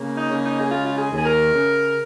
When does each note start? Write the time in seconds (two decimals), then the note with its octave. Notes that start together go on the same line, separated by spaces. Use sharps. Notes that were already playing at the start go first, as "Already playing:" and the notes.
Already playing: C#3 A#3
0.17 D#4
0.30 C#3
0.44 D#4
0.60 G#4
0.70 G#3 F4
0.86 F4
0.97 G#4
1.11 D#2
1.18 G#4
1.25 A#4
1.52 C#3